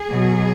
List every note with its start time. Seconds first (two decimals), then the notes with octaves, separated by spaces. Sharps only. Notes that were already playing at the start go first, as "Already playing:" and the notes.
Already playing: G#4
0.11 B2 F#3